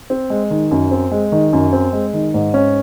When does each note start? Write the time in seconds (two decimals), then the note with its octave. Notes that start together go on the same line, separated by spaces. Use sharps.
0.10 C4
0.30 G#3
0.50 D#3
0.71 F#2
0.91 C4
1.11 G#3
1.32 D#3
1.53 F#2
1.73 C4
1.93 G#3
2.14 D#3
2.34 G#2
2.54 C#4